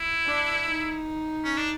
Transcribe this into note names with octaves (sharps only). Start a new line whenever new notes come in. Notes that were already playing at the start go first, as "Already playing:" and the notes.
Already playing: E4
D4
D#4
C#4
D4